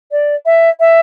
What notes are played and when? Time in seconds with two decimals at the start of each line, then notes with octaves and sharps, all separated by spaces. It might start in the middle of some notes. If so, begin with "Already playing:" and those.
0.11 D5
0.46 E5
0.80 E5